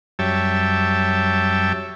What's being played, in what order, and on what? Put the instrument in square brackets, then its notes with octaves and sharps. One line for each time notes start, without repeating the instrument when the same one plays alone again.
[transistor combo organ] F#2 G3 C#5 E5 G5 A5